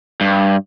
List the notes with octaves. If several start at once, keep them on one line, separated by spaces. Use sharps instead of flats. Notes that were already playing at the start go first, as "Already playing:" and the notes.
G2